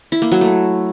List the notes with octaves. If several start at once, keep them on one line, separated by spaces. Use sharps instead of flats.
E4
A#3
F#3
A3